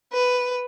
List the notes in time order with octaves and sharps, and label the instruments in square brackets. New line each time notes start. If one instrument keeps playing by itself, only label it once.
[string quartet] B4